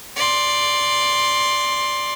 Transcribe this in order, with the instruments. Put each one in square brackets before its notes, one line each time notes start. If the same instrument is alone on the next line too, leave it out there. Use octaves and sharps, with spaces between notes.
[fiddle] D5 C6